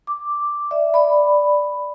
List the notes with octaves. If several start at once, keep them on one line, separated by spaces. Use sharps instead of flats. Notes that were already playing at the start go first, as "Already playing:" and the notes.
D6
D5 E5
D5 B5